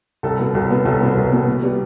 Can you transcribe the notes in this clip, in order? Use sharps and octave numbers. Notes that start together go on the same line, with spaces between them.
C2 A4
B2 B3
C2
B2 B3
C2 A4
B2 B3 B4
C2 B4
B2 B3
B2
G3 B3